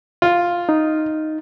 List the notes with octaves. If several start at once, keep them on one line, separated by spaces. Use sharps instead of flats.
F4
D#4